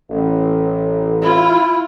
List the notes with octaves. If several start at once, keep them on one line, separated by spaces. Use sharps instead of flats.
A1
E4 F4